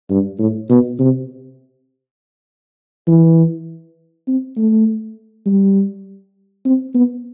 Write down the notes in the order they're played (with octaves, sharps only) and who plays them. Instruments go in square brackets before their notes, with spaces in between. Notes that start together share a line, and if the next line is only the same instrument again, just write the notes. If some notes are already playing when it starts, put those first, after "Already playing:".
[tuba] G2
A2
B2
C3
E3
C4
A3
G3
C4
B3